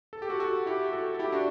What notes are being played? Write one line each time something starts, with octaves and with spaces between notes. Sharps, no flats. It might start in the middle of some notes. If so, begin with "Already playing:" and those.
A4
G4
F#4 A4
F#4 A4
E4 G4
G4
F#4 A4
A4
E4 G4
D4 F#4